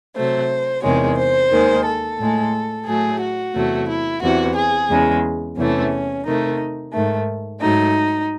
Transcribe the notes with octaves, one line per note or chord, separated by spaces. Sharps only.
C3 F#3 A3 C5
E2 C3 D#3 G#3 C#5
C5
D#2 D#3 G#3
A4
A2 G#3
A2 F#3 A3 G#4
F#4
E2 C3 F#3 A3
E4
E2 C3 E3 F#4
G#4
E2 C#3 G#3
E2 C3 E3 A3 C#4
C3 D#3 A3 D#4
G#2 D#3 A3
G#2 F#3 A3 D#4